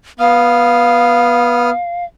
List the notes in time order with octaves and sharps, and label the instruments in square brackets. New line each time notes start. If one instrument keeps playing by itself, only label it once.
[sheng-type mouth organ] B3 D#6 F6 [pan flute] F5